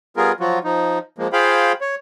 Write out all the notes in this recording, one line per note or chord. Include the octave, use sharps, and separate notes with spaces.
G3 B3 F4 G#4 A#4
F3 F#3 F4 F#4
F3 D#4
F3 G#3 A#3
F4 G#4 C5 F5 G5 B5
C#5